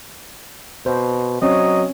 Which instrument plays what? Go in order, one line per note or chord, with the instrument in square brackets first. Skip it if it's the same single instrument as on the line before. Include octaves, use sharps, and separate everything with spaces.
[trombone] B2 [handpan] C5
[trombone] F#3 [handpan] C4 C#4 C#5 [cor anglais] D#5